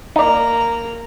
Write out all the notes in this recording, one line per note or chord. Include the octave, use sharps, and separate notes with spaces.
A#3 D#4 D5 A#5